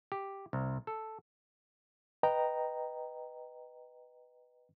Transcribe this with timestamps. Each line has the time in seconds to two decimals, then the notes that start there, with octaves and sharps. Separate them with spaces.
0.12 G4
0.53 C2
0.87 A4
2.23 B4 D#5 G5 A#5